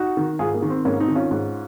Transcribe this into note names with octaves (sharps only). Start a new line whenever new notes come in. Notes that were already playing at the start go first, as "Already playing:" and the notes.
Already playing: D#4 F#4
D#3
G#2 F4 G#4
A#3
D#3
C4
G#2 A#3 C#4
C4 D#4
D#3
C#4 F4
G#2